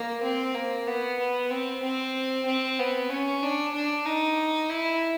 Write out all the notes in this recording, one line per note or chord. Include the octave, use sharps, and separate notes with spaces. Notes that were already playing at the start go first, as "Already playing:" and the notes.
Already playing: A#3
C4
A#3
B3
B3
C4
C4
C4
B3
C#4
D4
D4
D#4
E4